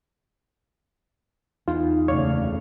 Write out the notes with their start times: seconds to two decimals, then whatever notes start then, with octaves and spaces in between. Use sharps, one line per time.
1.68 E2 D#4 F4
2.08 F#1 D2 C#3 C#5 D5 F5